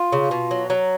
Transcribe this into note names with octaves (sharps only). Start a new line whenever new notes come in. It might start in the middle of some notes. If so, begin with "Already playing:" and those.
Already playing: F4
C#3
B2
F#3
F#3